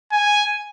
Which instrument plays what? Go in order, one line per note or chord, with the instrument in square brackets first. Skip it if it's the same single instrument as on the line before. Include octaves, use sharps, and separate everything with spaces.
[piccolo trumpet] G#5